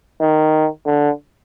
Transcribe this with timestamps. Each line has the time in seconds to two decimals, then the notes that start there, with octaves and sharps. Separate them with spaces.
0.20 D#3
0.86 D3